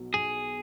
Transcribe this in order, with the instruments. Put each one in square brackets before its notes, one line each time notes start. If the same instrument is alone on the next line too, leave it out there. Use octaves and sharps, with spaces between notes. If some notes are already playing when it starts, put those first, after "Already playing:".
Already playing: [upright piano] B1 B2 F#3
[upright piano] B1 [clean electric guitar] G#4